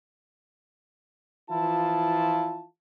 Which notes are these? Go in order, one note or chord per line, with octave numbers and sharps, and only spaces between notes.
E3 F3 E4 F4 A5